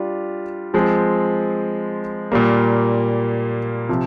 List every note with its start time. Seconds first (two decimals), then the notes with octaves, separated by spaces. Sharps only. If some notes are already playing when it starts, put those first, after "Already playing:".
Already playing: G3 D4 F4
0.74 F3 G#3 C4
2.32 A#2 G3 A#3
3.89 C3 F3